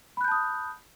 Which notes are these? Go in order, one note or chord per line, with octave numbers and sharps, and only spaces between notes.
A5 B5 D#6 F#6 G6